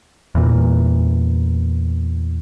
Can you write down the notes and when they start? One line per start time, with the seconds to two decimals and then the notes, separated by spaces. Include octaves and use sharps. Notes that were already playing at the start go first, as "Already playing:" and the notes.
0.35 E2 A#2